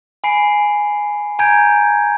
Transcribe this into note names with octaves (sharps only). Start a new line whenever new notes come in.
G#5 B5 C7 D7
G#5 A#5 G6 G#6 D7